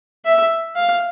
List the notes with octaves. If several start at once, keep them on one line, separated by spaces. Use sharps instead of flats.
E5
F5